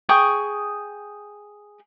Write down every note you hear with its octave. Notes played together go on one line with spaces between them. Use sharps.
G#4 G5 C#6 D#6